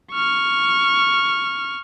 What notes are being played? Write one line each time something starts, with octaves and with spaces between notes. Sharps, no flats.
C#6 F6